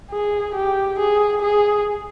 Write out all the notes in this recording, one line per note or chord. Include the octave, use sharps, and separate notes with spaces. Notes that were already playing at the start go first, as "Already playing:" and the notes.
G#4
G4
G#4
G#4